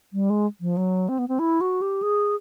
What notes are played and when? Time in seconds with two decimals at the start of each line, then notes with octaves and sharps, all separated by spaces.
0.13 G3
0.30 G#3
0.61 F3
0.77 F#3
1.09 C4
1.19 B3
1.28 C4
1.39 E4
1.61 F#4
1.81 G4
2.02 G#4